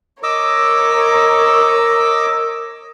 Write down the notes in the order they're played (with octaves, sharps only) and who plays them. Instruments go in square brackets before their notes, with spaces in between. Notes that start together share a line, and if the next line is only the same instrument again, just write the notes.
[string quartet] A#4 C#5 [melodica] D#5 D6 E6